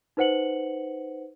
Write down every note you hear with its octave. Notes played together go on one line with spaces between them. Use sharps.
D#4 B4 C5 F#5 C#7 F#7